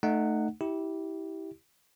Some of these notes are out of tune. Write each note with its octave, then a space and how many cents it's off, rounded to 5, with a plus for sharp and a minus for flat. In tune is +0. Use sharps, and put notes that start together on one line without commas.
A3 +0 D#4 -25 F#5 +0
E4 -25 G4 -10